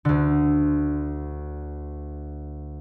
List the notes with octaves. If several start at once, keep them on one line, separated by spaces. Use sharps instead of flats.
D2 D3